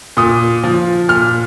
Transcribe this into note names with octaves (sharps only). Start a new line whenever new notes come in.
A#2 D#6
F3
A#2 F6